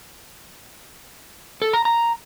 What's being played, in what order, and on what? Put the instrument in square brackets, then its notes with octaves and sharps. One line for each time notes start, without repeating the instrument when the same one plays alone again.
[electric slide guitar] A4
A#5
A#5